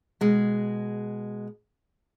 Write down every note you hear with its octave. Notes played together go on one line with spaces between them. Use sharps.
B2 G#3